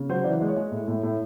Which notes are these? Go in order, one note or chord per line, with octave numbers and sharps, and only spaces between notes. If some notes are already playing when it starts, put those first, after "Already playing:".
Already playing: C#3
F#3 C5
E3 D5
G#3
C#5
G#3
A2
A2
A2